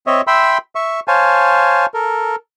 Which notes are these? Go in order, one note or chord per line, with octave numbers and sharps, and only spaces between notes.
C4 C#5 D#5 E5
E5 G5 B5 C6 E6
E5 C#6
C5 C#5 F5 G#5 A5
A4 A#4